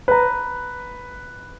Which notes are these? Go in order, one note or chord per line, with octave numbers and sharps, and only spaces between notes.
B4 A#5